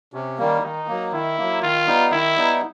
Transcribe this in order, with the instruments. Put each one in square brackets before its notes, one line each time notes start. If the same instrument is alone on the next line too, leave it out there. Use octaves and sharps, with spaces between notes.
[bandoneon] C3 [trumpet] C#4
[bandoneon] D#3 G3 A#3
[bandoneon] D#3 [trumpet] D#4
[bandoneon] F#3 A#3
[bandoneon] D#3 [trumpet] E4
[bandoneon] F#3 A#3
[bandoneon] D#3 [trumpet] F4
[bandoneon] G3 B3 D#4
[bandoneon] D#3 [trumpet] E4
[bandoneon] G3 B3 D#4